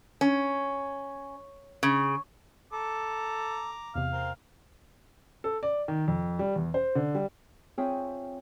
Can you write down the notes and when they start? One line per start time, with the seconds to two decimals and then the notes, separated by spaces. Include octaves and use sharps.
0.21 C#4
1.83 C#3
2.73 A4 A#5 D6
3.95 E2 C3 F5
4.12 C4 A#4
5.44 A4
5.63 D5
5.88 D#3
6.08 F2
6.39 G3
6.56 E2
6.74 C5
6.95 D3
7.15 G3
7.78 C4 F4 G#4 C#5 E5 G5